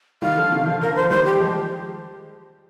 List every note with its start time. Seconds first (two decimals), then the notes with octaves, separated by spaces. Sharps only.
0.22 D#3 G3 F5
0.37 D3 F3
0.52 C3 D#3
0.66 D3 F3
0.81 D3 F3 A#4
0.96 C5
1.10 D#3 G3 C5
1.25 G4
1.39 F3 G#3